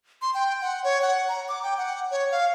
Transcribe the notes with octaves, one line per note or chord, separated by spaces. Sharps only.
C6
G5
F#5
C#5
F#5
A#5
D6
G5
F#5
C#5
F5